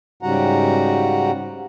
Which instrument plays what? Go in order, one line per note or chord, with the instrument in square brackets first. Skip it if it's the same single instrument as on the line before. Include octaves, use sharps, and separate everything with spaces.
[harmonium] G#2 C#3 G3 F#4 F#5 A#5